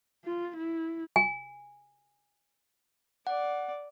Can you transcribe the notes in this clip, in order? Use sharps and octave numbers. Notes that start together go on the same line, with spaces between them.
F4
E4
G#5
D5 F#5